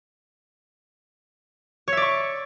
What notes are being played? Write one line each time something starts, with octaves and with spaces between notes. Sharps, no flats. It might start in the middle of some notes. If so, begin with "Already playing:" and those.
C#5 D5 E5 C#6